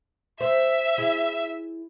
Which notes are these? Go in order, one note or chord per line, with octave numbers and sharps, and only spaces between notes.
C5 E5
E4 G#4